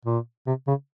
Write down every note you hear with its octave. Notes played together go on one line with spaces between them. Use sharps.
A#2
C3
C#3